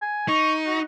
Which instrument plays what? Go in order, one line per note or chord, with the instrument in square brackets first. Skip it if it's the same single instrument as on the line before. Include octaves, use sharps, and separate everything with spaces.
[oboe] G#5
[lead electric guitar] D#4 [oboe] C#6
[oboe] F#4